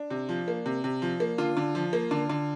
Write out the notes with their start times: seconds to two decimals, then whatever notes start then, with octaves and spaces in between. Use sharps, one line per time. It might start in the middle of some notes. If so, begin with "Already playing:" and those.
Already playing: D4
0.10 C3
0.29 F3
0.48 A#3
0.66 C3
0.84 C3
1.02 F3
1.20 A#3
1.38 D3 F4
1.57 D3
1.75 F3
1.93 A#3
2.11 D3
2.30 D3